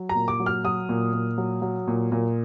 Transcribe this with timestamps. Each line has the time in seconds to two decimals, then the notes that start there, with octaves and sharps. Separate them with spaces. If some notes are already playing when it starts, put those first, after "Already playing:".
Already playing: F#3
0.09 A#5
0.15 A#2
0.28 D6
0.40 F#3
0.46 F6
0.64 F#3 D#6
0.89 A#2
1.13 A#2
1.38 F#3
1.62 F#3
1.87 A#2
2.12 A#2